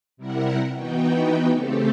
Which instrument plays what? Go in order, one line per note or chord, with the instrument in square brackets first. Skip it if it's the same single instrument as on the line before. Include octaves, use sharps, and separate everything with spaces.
[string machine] C3 G3 E4 A#4 F#5
E3 B3 D#4 F#4 G5
C#3 A3 C4 G4 A4